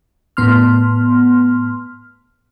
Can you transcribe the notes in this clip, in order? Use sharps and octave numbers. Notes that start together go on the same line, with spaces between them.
A2 B3 C6 F6